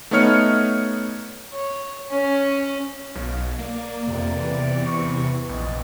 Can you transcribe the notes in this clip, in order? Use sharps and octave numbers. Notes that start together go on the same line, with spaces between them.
A3 B3 D#4 C#5 F6 C#7
C#5
C#4
B1 C#5 F5
A#3 D5
F2 C3 A#3
E2 E3
C#6
A#1 C4 D5 D#5